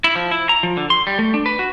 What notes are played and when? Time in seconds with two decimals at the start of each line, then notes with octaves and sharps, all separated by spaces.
0.04 E4
0.15 F3
0.31 E4
0.49 A#5
0.63 F3
0.77 D3
0.90 C6
1.07 G3
1.19 A3
1.34 D4
1.46 B4
1.59 F#4